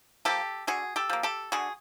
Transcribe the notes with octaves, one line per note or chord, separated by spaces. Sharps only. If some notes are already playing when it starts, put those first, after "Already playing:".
F3 A#3 G4 A4
D3 F#4 G#4
G4 A4
F3 A#3
G4 A4
D3 F#4 G#4